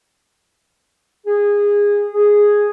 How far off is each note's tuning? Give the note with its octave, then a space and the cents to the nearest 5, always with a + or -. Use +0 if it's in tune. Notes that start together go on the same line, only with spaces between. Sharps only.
G#4 -20
G#4 +0